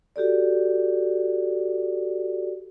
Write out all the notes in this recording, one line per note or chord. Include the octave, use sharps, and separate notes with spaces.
F#4 G4 A4 D5